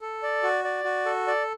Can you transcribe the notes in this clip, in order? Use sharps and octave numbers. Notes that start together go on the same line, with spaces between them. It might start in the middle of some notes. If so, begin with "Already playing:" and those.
A4
D5
F#4
D5
F#4
A4
D5